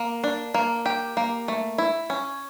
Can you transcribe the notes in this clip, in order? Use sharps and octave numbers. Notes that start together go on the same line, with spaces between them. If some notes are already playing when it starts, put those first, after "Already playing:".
Already playing: A#3
D4
A#3
G4
A#3
A3
E4
C#4